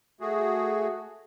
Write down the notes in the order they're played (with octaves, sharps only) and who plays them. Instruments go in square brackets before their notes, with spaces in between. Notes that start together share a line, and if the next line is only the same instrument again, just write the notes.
[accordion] A3 F#4 G#4